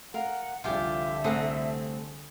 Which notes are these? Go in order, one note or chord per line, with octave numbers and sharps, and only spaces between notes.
A#4 F5 F#5
C2 D3 F3 F4 G4 E5 G#5
A3 C4 G#4 A4 F#5 A#5